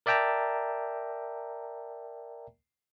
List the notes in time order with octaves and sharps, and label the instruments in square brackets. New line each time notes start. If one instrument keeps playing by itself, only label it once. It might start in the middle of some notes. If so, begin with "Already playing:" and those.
[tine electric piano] A#4 D5 E5 G5 A5 A#5